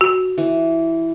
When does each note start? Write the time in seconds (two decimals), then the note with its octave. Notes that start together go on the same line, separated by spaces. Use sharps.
0.01 F#4
0.38 E3